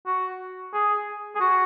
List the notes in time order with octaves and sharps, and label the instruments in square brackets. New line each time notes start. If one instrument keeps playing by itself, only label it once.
[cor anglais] F#4
G#4
G#4
F#4